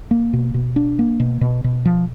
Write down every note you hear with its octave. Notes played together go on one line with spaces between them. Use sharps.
A#3
B2
B2
D4
A#3
B2
B2
B2
F3